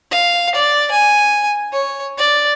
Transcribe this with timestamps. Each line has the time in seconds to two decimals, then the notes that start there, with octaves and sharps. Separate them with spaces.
0.11 F5
0.55 D5
0.91 G#5
1.73 C#5
2.18 D5